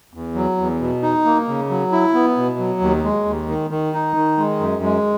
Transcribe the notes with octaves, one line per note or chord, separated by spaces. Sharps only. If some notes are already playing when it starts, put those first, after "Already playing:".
E2
F#3
E2
B2
D#4
A#3
C#3
F#3
E4
B3
B2
F#3
D#2
G#3
D#2
D#3
D#3
D#4
D#3
G#3
F#2
G#3